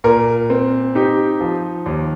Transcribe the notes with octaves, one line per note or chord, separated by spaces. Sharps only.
A#2 A#4
C4
D#4 G4
F3
D#2